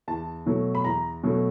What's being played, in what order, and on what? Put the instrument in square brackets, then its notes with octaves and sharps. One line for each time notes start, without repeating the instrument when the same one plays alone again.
[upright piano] E2 A5
B2 F#3 A3
B5
E2 A#5
B2 F#3 A3